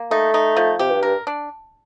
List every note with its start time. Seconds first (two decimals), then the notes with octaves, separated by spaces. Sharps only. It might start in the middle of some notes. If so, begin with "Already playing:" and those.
Already playing: A#3
0.11 A3 D#4
0.34 D#4
0.57 F3
0.79 C3 G4
0.91 G2
1.03 G2 A#4
1.27 D4